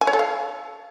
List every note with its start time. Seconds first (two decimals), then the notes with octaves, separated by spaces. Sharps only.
0.01 G#5
0.07 C#5
0.13 A4
0.19 F5